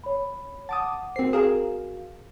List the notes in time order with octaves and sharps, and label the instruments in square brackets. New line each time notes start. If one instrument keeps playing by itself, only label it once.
[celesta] C#5 B5
[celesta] F#5 [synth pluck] A5 D6 D#6
[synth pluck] C4 C7 [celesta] F#4 A#4 C5
[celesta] F#4 F5 E7 [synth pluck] G#4 A#4